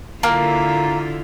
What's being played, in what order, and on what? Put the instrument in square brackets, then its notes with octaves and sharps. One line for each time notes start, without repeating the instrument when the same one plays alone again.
[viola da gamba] D3 E4 F4 [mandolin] A#3